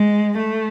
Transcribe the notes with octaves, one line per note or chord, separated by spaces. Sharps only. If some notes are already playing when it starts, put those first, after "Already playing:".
Already playing: G#3
A3